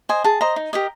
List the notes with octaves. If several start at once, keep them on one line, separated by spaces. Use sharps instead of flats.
C5 D#5 G#5
G#4 A5
C5 D#5 A#5
D#4
G4 A#4 D#5